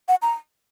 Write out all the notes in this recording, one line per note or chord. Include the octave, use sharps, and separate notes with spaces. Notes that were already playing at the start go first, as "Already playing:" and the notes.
F#5
A#5